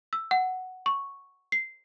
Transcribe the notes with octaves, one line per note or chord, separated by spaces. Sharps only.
E6
F#5
C#6
C7